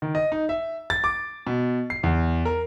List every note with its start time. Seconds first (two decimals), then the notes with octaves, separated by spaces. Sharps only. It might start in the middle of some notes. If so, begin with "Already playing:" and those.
0.02 D#3
0.15 D#5
0.32 D#4
0.49 E5
0.90 A6
1.04 D6
1.47 B2
1.90 C7
2.03 E2
2.45 A#4